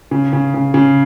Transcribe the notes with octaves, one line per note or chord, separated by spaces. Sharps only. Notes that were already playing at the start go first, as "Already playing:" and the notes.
C#3
C#3
C#3
C#3